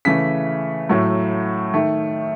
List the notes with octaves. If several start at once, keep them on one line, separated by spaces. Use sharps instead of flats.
C#3 E3 A3 B6
A2 F#3 A3
D#3 A3